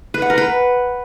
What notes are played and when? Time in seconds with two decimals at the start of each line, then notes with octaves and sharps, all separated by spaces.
0.14 B4
0.22 F#5
0.30 A#4
0.38 B4